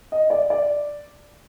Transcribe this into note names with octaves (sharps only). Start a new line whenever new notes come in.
D#5
D5
D5